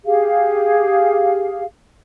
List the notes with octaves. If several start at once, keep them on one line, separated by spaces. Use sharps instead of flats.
G4 G#4 F5